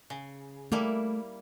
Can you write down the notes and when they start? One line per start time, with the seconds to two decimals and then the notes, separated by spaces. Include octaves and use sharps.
0.10 C#3
0.72 G3 A3 A#3 E4